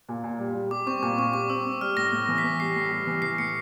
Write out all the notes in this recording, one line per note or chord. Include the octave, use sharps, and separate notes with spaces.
A#2
A#2
G3
G3
G3 D6
C4 C#6
A#2 D6
C4 C#6
G3 D6
C4 E6
C4
G3 F6
A2 A#6
A2
E3
B6
E3
G3 C7
A2
G3
E3
E3 C7
A2 C#7